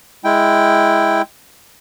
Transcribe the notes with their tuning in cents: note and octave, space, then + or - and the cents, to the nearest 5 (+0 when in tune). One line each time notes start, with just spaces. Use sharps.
G#3 +0 E4 +0 G5 +0